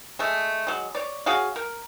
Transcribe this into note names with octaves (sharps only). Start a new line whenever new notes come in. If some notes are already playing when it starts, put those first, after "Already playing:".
G#3 A3
F#3 G#3
C#5 D5
F#4 G#4 C#5 F5
A#4